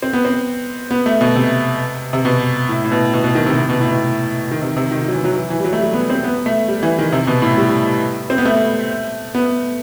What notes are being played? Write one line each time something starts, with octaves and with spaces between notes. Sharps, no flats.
C4
B3
C4
B3
A3
B2
C3
C3
B2
A2
A2
B2
B2
B2
D#3
C3
C3
B2
A2
B2
D#3
C3
C3
D#3
D#3
F#3
E3
F#3
E3
E3
G3
F#3
A3
G3
B3
C4
B3
A3
G3
E3
D#3
C3
B2
A2
G3
C4
B3
A3
B3